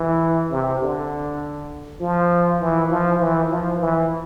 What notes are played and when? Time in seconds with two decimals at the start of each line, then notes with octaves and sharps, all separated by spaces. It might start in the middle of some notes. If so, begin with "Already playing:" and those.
Already playing: E3
0.51 C3
0.81 D3
2.01 F3
2.60 E3
2.90 F3
3.20 E3
3.50 F3
3.80 E3